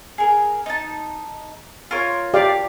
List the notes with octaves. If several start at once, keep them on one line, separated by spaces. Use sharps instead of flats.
G#4 A#4
D#4 A5
F4 A#4 C#5
G4 D5 F5